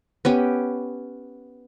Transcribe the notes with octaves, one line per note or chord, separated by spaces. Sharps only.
B3 C#4 G4